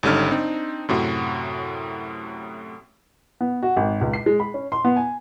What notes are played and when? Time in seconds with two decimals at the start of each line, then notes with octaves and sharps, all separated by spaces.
0.03 G#1 D3 G3 C#4 D#4 F6
0.31 C4 D4 D#4
0.89 F#2 A2 C3 F#4
3.41 B3
3.63 F#4
3.77 G#1
4.01 C#2
4.13 C7
4.26 G#3
4.40 B5
4.54 C#4
4.72 C6
4.85 B3
4.96 G#5